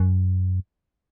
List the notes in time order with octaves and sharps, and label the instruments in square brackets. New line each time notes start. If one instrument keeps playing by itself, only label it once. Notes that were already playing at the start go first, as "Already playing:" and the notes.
Already playing: [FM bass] F#2